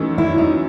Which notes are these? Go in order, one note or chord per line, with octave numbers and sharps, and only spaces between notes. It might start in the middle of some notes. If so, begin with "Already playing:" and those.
Already playing: F#2 E3 A3 D#4
E4
D#4